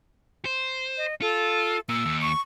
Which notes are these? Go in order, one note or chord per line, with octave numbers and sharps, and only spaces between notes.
C5
D#5
F4 A4
A#2 A#3 E6
D#2
C#6